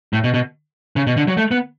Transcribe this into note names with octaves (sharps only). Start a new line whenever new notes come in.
A2
B2
B2
C#3
B2
D3
F#3
A3
B3